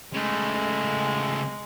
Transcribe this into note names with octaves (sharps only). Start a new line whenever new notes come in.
C#3 G#3 A3